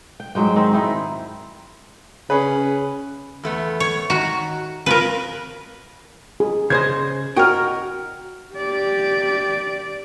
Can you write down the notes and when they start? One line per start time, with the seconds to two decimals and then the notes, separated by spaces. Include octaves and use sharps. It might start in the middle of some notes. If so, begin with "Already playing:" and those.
0.20 G5
0.35 G#2 F#3 G#3 G5
0.56 D#3 C4
0.73 D#4 E4 G5
2.30 C#3 C#4 G#4 B4
3.43 E2 A3 B3
3.80 C#5
4.10 D#3 F#4 A#5
4.86 C#3 C4 F4 A#4 B4
6.40 G#4
6.70 C#3 C5 D#5 G#6
7.37 F#4 A#4 D#5 G5 F6
8.55 G4 D5